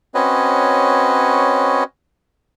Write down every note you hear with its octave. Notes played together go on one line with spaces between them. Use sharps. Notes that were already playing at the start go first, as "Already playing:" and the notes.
C4 C#4 F#4 B4 C#5 D#5